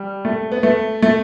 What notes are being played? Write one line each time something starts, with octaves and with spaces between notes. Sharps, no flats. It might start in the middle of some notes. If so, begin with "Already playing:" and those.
Already playing: G3
A3
B3
A3
A3